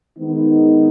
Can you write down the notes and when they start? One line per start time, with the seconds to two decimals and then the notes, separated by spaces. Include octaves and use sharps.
0.18 D#3 G#3 B3 D#4